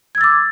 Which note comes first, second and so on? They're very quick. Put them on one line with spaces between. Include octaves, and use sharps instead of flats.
G#6 E6 A6 D6